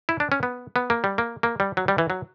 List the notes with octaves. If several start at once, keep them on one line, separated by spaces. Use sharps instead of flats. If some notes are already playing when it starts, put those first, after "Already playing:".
E4
D4
C#4
B3
B3
A#3
G3
A#3
A#3
G3
F#3
G3
E3
F#3